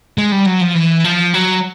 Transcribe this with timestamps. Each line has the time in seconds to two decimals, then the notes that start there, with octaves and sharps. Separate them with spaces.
0.18 G#3
0.32 G3
0.46 F#3
0.61 F3
0.75 E3
1.04 F3
1.34 F#3